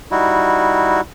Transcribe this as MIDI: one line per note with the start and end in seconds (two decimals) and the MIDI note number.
0.11 1.01 55
0.11 1.01 63
0.11 1.01 64
0.11 1.01 66